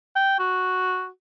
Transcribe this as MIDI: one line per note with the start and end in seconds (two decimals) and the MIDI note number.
0.16 0.37 79
0.39 1.08 66